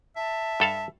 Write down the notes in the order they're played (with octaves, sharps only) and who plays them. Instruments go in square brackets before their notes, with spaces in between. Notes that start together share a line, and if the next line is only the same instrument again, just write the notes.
[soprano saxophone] E5 [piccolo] A5
[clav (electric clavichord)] G2 A4 F5